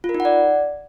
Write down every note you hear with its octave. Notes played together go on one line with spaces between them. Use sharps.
F4
A#4
D#4
F#5
D5